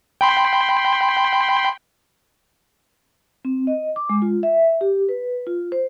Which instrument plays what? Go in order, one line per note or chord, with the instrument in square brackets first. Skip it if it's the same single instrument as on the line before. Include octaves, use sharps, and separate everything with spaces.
[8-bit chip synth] G5 B5 C6
[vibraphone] C4
D#5
D6
G#3
F4
E5
G4
B4
F4
C5